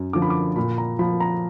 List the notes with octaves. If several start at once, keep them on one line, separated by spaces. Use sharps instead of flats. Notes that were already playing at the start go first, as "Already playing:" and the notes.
Already playing: F#2
D3 F3 D6
B5
D6
A#2 B5
A#5
F3 B5
A#5